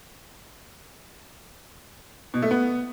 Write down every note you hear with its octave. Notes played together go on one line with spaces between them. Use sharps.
B2
A3
B3